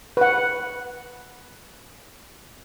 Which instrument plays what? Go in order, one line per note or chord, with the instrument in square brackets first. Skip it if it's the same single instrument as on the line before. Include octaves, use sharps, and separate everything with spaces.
[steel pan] B4 F#5